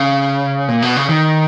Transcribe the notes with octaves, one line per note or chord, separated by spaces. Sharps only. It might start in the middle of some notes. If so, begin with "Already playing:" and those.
Already playing: C#3
A#2
B2
C#3
D#3